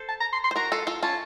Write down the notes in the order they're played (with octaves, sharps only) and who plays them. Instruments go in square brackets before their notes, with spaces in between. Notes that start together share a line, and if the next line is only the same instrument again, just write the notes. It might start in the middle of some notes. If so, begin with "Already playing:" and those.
Already playing: [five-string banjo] A4 C5
[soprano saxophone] A5
A#5
C6
C6
[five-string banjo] C5
[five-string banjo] F#4 A#4 [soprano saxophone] A#5
[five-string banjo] F4 A4
F4 A4
[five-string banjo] C#4 F4 [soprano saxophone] A5